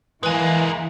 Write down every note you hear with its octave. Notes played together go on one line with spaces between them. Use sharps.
E3 G#3 A#3 B4 G#5